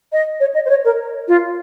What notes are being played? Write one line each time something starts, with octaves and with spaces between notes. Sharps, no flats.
D#5
C#5
D#5
C5
C#5
A#4
F4